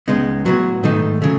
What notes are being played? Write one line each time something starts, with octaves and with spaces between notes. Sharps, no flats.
C#2 C#3 G#3 B3 D#4
A2 F#3 B3 F#4
G#2 D#3 A3 D#4
C#3 F#3 A3